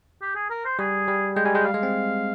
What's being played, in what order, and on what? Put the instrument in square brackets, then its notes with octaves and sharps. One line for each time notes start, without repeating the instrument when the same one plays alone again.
[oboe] G4
G#4
A#4
C5
[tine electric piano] G3 [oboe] G#4
[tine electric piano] G3
[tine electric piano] G#3 [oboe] G5
[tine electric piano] G3 [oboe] G#5
[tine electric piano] G#3 [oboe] G5
[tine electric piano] G3 [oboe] F5
[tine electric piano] G#3
C4